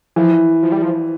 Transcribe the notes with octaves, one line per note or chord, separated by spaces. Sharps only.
E3 F3
F3
G3
F3